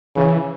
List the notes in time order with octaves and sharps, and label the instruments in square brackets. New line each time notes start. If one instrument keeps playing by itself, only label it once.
[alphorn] C#3 [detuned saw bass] E3